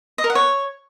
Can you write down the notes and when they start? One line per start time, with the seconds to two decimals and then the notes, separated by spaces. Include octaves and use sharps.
0.18 D#5
0.24 A#4
0.30 F#5
0.35 C#5